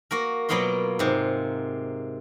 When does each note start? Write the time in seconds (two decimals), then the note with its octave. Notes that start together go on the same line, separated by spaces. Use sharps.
0.11 A#3 F#4 A#4
0.49 B2 F#3 A#3 B3 F4 C6
0.99 G#2 C3